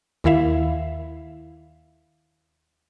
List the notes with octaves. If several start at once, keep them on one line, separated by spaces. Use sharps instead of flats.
D#2 D#3 E4 E5 F5